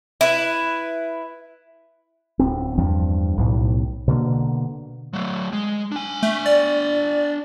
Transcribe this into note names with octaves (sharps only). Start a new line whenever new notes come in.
E4 B4
D1 C4
E2 G2 F3
B1 A2
B2 D3 A#3
F#3 A3
G#3
D4 G#5
A3
D5